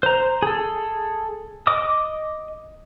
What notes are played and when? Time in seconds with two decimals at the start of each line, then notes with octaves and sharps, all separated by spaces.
0.03 C5 A#5
0.43 G#4 A4
1.67 D#5 D6 D#6